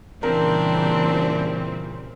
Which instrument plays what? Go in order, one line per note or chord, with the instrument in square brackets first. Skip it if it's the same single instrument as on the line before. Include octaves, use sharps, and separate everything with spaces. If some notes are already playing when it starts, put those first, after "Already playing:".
[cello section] A#2 C#3 G3 [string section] E3 C4 [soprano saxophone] D4 [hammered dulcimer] A#4